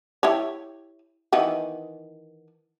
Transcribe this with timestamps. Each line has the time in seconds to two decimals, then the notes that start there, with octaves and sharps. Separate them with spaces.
0.23 E4 G4 C#5
1.32 D#3 E3 B3